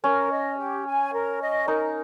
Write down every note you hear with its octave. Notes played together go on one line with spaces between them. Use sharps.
C#4 A#4
D#5
G4
G#5
A#4
D#5
D#4 A#4